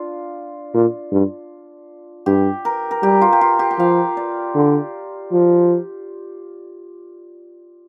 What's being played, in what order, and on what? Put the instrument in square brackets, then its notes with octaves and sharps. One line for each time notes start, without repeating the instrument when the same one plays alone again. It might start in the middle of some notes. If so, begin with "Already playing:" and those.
Already playing: [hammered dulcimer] D4 F4
[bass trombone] A#2
G2
[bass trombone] G2 [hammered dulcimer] G4
[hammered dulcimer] A#4
A#4
[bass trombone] G3 [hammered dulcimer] G4
[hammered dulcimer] F4
G4
F4
G4
G5
[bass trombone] F3 [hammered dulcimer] F5
[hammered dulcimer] D5
[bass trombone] D3
F3